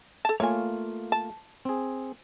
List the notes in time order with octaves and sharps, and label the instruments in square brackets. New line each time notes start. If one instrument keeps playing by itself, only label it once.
[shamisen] A4 A5
[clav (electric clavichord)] A3 A#3 F4 [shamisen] C#5 G#5
[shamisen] A5
[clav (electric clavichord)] C4 G#4